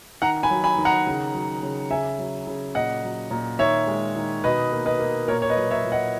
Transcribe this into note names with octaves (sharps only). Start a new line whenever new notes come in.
D#3 F#5 A#5
G#5 B5
F#3
G#5 B5
D#3
F#5 A#5
C#3
F#3
C#3
C#3 E5 G#5
F#3
C#3
A#2 D#5 F#5
F#3
A#2
D#3 C#5 E5
G#3
D#3
B2 B4 D#5
A#3
B4 D#5
A#3
A#2 A#4 C#5
C#5
B4 D#5
F#3
C#5 E5
A#2
D#5 F#5